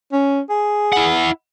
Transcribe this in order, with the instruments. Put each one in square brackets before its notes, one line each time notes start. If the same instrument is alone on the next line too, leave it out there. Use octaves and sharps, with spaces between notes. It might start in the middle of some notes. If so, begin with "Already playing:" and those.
[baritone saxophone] C#4
G#4
[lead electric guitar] E4 F#5